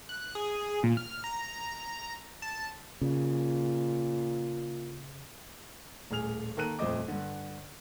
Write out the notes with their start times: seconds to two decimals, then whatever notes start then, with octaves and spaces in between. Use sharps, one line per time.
0.09 F#6
0.35 G#4
0.83 A#2
0.97 F6
1.24 A#5
2.42 A5
3.02 A#2 C#3
6.11 D#1 A2 G#4 F6 F7
6.57 D#3 A#3 A4 A#5 F#6 D#7
6.79 D#1 F2 A3 C5 D#5 D6
7.08 G2 D3